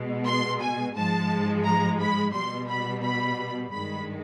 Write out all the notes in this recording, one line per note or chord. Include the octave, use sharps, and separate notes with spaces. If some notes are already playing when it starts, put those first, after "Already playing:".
Already playing: B2 G#3
C6
G#5
G#2 F3 G#3 A5
A#5
B5
B2 G3 C6
B5
B5
G2 D#3 G#3 B5